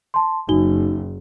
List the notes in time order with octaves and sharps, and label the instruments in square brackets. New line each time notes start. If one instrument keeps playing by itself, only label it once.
[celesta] A5 C6
[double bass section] F#1 [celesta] D#4 F#4 G7